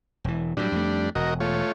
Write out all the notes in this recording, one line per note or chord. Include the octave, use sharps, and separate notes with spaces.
E1 E3
A2 D#3 F#3 G3 D4
F2 A3
E1 F#4 A#4 D#5
A3 F4 C#5